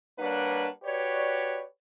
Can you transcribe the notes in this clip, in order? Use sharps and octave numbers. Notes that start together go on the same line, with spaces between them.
G3 A#3 D4 B4 C#5 F#5
F#4 G4 B4 C#5 D5